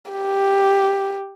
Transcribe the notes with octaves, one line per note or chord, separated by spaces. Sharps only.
G4